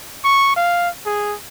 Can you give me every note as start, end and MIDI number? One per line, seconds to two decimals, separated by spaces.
0.24 0.53 85
0.56 0.89 77
1.06 1.35 68